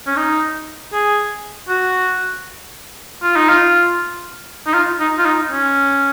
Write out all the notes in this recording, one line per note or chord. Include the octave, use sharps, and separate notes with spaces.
C#4
D#4
G#4
F#4
F4
D#4
F4
D#4
F4
D#4
F4
D#4
C#4